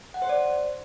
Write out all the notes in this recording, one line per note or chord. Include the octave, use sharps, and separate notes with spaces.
F#5
C5
D5